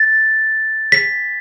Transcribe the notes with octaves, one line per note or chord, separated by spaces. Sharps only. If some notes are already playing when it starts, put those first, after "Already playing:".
Already playing: A6
B6